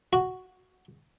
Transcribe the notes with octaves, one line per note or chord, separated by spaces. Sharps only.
F#4